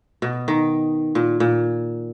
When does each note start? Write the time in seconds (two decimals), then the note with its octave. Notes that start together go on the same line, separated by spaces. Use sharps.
0.22 B2
0.48 D#3
1.15 A#2
1.40 A#2